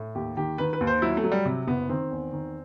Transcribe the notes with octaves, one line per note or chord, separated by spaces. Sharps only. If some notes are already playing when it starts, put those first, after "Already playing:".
Already playing: A2
D#2 G4
D#3 G4
D#3 B4
B4
D#2
C5
F#3 E4
A3
F#3
G3
C3
F#1 B3
D#3 C4
E2
D#3